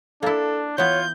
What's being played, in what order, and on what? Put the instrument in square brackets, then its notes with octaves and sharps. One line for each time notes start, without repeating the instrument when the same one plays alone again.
[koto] A#3 E4 [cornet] D4 [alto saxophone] A4
[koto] E3 B3 [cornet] F4 [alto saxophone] C#5 [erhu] G6